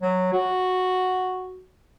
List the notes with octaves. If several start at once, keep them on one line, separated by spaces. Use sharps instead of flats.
F#3
F#4